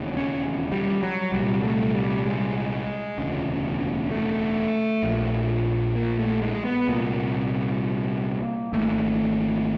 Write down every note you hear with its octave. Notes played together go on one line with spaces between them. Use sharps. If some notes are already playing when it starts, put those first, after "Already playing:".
Already playing: E1 D#2 C#3
C#4
G3
F#3
C2 A#2 G3
A3
G3
G#3
E1 D2 C#3
A3
A#1 A#2
A#3
A3
G#3
B3
C2 A#2 A#3
G#1 G#2 A3